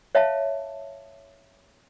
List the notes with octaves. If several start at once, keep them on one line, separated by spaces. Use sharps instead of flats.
C#5 E5 F5 A5